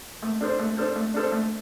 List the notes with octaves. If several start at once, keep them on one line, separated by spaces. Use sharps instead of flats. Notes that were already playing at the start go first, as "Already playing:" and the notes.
A3
D4 A4 C5
A3
D4 A4 C5
A3
D4 A4 C5
A3